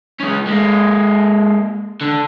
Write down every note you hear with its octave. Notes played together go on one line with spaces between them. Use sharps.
G#3 C#4
G#3 A#3
D3